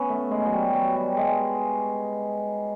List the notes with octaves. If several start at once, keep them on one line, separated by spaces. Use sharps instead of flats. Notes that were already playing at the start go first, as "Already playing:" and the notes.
Already playing: B3 C#4
A3
G#3
F#3
G3
F#3
G3
G#3